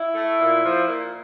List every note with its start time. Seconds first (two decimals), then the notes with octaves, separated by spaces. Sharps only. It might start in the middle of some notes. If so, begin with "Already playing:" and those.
Already playing: E4
0.15 A3
0.39 A#2
0.64 F3
0.87 A#2